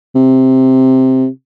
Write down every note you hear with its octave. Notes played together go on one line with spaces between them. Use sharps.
C3